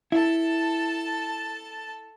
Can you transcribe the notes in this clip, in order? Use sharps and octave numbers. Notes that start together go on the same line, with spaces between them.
E4 A4 A5